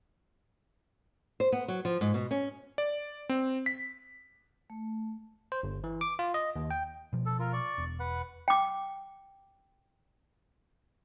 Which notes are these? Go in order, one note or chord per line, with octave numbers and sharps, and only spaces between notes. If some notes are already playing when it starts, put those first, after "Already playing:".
C5
B3
F#3
F3
G#2
B2
C#4
D5
C4
B6
A3
C5
G1
E3
D6
F4
D#5
D#2
G5
B2 F3
A4
F4 A#4
D5 C#6
E1
B4 F#5
G5 D6